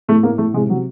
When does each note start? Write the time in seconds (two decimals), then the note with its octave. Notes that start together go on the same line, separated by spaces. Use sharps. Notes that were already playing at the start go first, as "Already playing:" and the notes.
0.08 A2 A3
0.23 A2 A#3
0.38 A2 A3
0.53 C3 G#3
0.69 C3 F#3